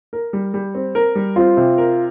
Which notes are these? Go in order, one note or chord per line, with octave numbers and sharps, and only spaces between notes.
A#4
G3
G3
C4
A#4
G3
C4 F4
C3
A#4